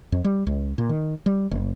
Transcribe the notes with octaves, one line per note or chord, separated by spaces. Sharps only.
F2
G3
C#2
A#2
D#3
G3
F#1